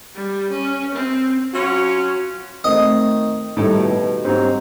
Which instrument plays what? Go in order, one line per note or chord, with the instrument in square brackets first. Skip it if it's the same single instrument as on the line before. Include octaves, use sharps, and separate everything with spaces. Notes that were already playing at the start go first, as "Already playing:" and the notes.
[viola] G3
C#4
C4
[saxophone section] F#3 C#4 F4 F#4
[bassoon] D#3 [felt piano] A3 C4 [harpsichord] D#5
[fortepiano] A2 A4 [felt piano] D#3 G3 D#4
[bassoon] B2
[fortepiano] G#2 F#3 [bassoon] C4 [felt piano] G4